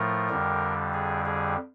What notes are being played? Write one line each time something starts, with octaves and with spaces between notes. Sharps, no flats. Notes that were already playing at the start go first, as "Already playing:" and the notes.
Already playing: A2 F3 A3 A#4
F2 D3 G3
G#4
G#4